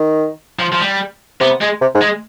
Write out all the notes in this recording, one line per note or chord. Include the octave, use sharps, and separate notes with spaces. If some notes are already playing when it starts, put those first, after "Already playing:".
Already playing: D#3
F3
F3
G3
C3 B3
G#3
C3
G#2
G#3